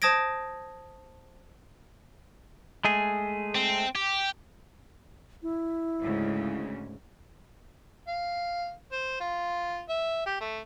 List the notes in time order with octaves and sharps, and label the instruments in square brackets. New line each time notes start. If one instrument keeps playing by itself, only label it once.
[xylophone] C5 A5 D#6 G#6 A#6 D7
[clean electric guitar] G#3 A3 G#4
[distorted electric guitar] C4
G4
[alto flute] E4
[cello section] D2 G#2 C#3
[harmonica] F5
C5
F4
E5
G4
A3